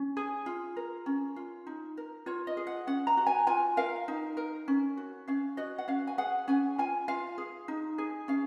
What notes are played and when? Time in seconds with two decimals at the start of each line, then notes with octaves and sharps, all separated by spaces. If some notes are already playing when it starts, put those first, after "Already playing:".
Already playing: C#4
0.17 G#4
0.46 F4
0.77 A#4
1.06 C#4
1.36 F4
1.67 D#4
1.97 A#4
2.26 F4 C#5
2.47 D#5
2.57 G#4
2.67 F#5
2.87 C#4 F#5
3.07 A#5
3.17 F#4
3.27 G#5
3.47 F4 G#5
3.77 A#4 F5
4.08 D#4
4.37 A#4
4.68 C#4
4.97 F#4
5.28 C#4 F5
5.57 F#4 D#5
5.78 F#5
5.88 C#4 F5
6.07 G#5
6.18 G#4 F#5
6.48 C#4 G#5
6.78 F4 G#5
7.08 F4 F5
7.38 G#4
7.68 D#4
7.98 G#4
8.28 C#4 F5